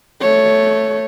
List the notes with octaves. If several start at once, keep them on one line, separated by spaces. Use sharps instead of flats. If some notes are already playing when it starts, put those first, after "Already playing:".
A3 C#5